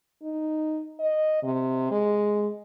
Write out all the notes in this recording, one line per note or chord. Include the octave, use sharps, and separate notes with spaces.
D#4
D#5
C3
G#3